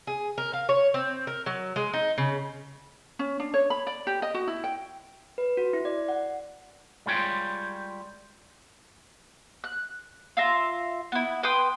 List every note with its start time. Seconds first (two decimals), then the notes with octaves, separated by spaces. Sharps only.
0.07 G#4
0.38 A#4
0.53 F5
0.69 C#5
0.94 C4
1.27 A#4
1.46 F#3
1.76 G#3
1.93 D#4
2.18 C#3
3.19 C#4
3.40 D4
3.54 C#5
3.70 B5
3.87 D5
4.07 G4
4.22 D#5
4.34 F#4
4.48 E4
4.64 G5
5.38 B4
5.57 F#4
5.73 E4
5.85 D5
6.09 F#5
7.06 G3 G#3 F4 C#5 G5
9.64 F#6
10.37 F4 E5 A#5
11.12 B3 E4
11.43 B4 G5 C6 D#6